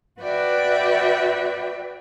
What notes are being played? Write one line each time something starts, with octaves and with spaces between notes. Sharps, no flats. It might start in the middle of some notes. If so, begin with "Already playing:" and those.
F#4 B4 D5 E5 G5